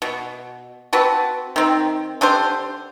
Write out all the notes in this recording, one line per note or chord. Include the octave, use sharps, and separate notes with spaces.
B2
C4 F#4 B4 A5
D#3 C4
D3 D4 G4 C5